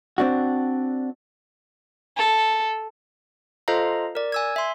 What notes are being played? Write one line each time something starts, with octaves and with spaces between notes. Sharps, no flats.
C4 D4 F#4
A4
F4 A4 C5 D#5 F5 A#5
A#4 D5
G#5 E6 G#6
E5 C6